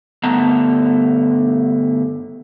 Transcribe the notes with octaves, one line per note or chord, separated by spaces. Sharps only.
G2 D3 A3 B3 A5 A#5